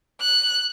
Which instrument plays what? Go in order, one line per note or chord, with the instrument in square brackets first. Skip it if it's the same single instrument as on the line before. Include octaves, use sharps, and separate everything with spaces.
[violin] F#6